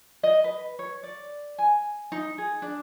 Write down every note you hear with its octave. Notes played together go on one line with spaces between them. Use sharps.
D#5
B4
C#5
D5
G#5
D#4
G#4
D4